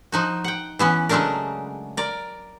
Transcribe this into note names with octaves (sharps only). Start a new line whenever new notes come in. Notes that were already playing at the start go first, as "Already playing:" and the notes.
F3 D#4 F#4
F#5 G5
E3 B3 C#4
C#3 F#3 G#3 A3 D4 A#4
A#4 D5